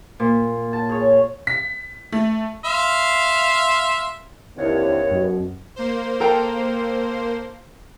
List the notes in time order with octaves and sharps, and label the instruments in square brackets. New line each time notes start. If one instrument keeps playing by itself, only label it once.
[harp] A#2
[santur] A5
G#4 C#5
[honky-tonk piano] B6
A3
[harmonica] E5 F5 C6
[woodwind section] D#2 C#5 [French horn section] D3 C4 E4
[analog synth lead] F#2 [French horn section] B2
[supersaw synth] A#3 C5
[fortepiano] A4 A#4 G5